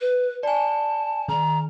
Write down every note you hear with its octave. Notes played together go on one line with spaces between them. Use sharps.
B4
D5 G#5 A5
D#3 A#5